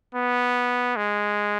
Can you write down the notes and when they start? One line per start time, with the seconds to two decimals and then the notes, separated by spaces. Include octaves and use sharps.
0.15 B3
0.97 G#3